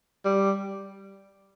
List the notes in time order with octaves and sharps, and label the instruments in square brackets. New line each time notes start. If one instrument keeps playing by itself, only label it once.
[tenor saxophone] G3